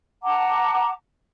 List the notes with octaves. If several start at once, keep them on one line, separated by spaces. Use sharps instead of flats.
F#5 A5 A#5 D6